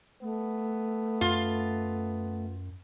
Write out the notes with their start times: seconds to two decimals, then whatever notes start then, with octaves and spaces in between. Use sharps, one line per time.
0.22 A3 B3
1.21 F#2 F4